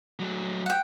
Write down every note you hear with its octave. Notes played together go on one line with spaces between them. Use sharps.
F#3 A3
F#5 G5